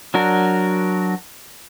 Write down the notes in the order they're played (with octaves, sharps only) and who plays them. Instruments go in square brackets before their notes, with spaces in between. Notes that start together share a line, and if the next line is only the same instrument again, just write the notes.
[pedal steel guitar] F#3 D4 F#4 A#4